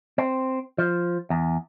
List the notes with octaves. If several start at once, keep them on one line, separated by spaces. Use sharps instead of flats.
C4
F3
E2